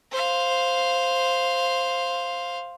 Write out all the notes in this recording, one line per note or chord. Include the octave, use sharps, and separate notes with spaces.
C5 F5